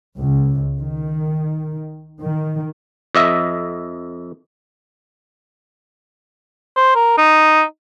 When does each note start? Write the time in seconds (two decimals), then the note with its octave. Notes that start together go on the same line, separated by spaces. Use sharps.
0.18 C#2
0.79 D#3
2.21 D#3
3.15 F2 D#5 E5
6.76 C5
6.95 A#4
7.17 D#4